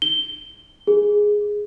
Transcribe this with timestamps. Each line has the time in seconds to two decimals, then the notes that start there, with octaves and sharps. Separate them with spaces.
0.02 G7
0.88 G#4